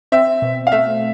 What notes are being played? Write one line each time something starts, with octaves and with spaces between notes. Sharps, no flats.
C4 E5
B2
F5
A3 E5